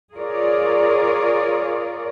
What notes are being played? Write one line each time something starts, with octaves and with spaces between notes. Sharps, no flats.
F4 G#4 A#4 C#5 D5